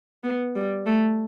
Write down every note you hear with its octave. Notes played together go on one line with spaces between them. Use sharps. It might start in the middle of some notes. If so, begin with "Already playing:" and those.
B3
G3
A3